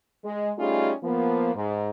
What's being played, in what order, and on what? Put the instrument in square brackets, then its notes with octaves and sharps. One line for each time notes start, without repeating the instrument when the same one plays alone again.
[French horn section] G#3
G3 A3 C#4 D#4 F4 G#4
F3 A#3 B3
G#2